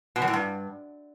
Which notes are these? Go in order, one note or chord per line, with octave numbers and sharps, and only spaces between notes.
B2
F#2
A2
G2